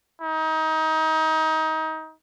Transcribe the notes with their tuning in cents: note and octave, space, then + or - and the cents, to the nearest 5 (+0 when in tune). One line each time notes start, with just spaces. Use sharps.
D#4 +25